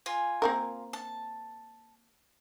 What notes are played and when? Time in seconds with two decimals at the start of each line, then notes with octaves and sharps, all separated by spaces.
0.06 F4 G#5
0.42 A#3 C4 A#4
0.93 A5